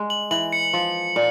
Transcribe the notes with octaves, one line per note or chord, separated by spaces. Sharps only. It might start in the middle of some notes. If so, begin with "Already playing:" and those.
Already playing: G#3
F#7
E3 F#7
C#7
F3
A#2